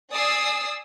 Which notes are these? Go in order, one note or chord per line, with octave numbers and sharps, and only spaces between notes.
D5 G#5 D#6 E6 C7